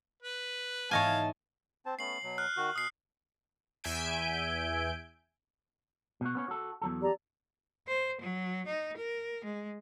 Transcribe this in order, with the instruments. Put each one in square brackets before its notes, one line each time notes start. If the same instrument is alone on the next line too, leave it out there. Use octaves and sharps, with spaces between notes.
[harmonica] B4
[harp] G#2 E3 B3 [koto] C#5 D#5 G#5 [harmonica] F5 [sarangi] A5
[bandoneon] C4 C5 A5
[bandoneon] A3 B3 C#4 [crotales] C7 F#7
[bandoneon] B2 F#3
[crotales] F6 F#6
[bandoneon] D#3 F#4
[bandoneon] B2 [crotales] D#6 C7
[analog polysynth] E2 E5 G#5 G6 D7
[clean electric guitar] B2 F#4
B3 C#4 C#5
F#4 A4
E2 F#3 A4
[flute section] G4 D5 A#5
[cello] C5
F#3
D#4
A#4
G#3